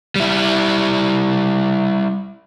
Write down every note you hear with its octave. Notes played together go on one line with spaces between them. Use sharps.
G3 E4